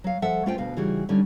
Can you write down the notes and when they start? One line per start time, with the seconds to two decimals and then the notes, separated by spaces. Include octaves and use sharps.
0.04 F#3 F5
0.22 F3 A4 E5 F#5
0.46 A3 C#4 F4 C5 D5 G5
0.58 D2 B2 F5
0.77 C#3 E3 G3 D#4 F#4 G#4
1.09 D3 G3 C#4 D#4